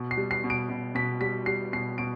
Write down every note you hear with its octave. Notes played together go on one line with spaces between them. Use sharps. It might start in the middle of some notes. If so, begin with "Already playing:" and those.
Already playing: B2
C7
G3
C7
B2
D7
B2
B2 B6
G3 B6
G3 C7
B2 C7
B2 D7